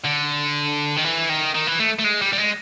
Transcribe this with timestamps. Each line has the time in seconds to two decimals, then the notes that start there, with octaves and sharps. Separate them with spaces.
0.05 D3
0.96 D#3
1.04 E3
1.29 D#3
1.54 D#3
1.67 E3
1.79 A3
1.99 A3
2.04 G#3
2.22 G3
2.33 G3
2.38 G#3